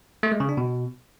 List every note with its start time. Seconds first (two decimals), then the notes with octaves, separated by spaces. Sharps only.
0.23 A3
0.32 G#3
0.40 C#3
0.49 D4
0.57 B2